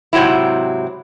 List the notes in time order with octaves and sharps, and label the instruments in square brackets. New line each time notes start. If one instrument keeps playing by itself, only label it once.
[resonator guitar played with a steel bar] G#2 C3 F#3 C4 E4